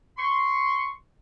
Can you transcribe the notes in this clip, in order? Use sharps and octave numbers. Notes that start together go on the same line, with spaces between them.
C6 C#6